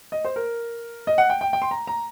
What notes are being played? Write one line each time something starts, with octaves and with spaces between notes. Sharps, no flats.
D#5
C5
A#4
D#5
F#5
G5
G5
G5
C6
A#5
A#5